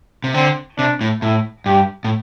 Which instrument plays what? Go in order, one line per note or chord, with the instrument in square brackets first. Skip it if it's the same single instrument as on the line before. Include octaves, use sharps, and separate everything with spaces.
[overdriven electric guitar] C3
[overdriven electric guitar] D3 [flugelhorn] C4
[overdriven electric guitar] C3 [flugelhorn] D4
[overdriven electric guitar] A2
[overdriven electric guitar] A2 [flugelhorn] E4
[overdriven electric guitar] G2 [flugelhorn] G4
[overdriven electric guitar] A2